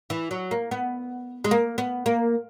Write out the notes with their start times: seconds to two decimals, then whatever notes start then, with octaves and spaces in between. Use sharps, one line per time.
0.10 E3
0.31 F#3
0.51 A#3
0.71 B3
1.44 G#3
1.51 A#3
1.78 B3
2.06 A#3